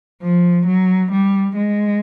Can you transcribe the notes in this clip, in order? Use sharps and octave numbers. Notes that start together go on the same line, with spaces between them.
F3
F#3
G3
G#3